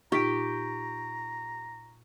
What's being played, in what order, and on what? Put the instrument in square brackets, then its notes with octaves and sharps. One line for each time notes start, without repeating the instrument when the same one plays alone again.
[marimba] A#2 D#4 F4 [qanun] G4 [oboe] A#5 [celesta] C#6 B6 D7